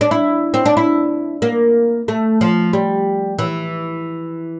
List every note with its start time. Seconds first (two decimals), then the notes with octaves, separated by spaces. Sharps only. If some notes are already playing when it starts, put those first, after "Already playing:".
0.01 D4
0.11 E4
0.54 C4
0.66 D4
0.77 E4
1.42 A#3
2.08 A3
2.41 F3
2.73 G3
3.39 E3